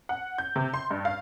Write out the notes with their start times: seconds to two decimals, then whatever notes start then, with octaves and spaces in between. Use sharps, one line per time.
0.09 F#5
0.38 G6
0.56 C3
0.74 C6
0.91 G2
1.05 F5